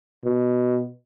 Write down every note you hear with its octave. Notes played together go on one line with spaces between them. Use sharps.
B2